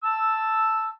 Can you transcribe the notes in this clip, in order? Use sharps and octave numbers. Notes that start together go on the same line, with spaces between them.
A5 E6